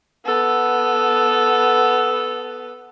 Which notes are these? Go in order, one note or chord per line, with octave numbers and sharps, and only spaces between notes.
B3 A4